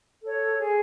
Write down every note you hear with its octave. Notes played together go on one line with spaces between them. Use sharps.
A4 C#5
G#4